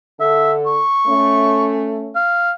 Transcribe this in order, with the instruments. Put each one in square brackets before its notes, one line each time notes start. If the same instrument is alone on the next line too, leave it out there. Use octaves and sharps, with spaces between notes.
[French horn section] D3 A4 [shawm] E5
[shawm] C#6
[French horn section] A3 C#4
[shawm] F5